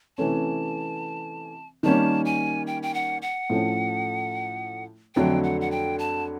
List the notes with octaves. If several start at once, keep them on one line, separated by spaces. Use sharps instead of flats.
C3 E3 A3 C#4 A5
D#3 G3 A#3 C#4 A5
G#5
G5
G5
F#5
F#5
A2 F3 A3 C#4
F2 D3 F#3 A3 G5
F#5
F#5
G5
A5